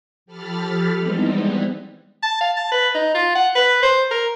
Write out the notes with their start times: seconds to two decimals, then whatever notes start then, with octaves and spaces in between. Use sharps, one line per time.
0.26 F3 G4 A4 B5 F6 A6
0.97 E3 G3 G#3 B3 C4 D#4
2.23 A5
2.41 F5
2.56 A5
2.72 B4
2.95 D#4
3.14 F4
3.35 F#5
3.55 B4
3.82 C5
4.11 A#4